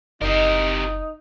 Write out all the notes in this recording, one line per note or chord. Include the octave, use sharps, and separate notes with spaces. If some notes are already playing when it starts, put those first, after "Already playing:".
F#1 C3 D#4 A#4 D#5